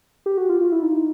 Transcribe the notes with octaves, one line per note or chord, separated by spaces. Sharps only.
G4
F#4
F4
F4
E4
D#4